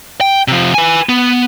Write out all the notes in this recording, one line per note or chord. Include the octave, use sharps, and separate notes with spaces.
G5
C3 F3
B4 G#5
B3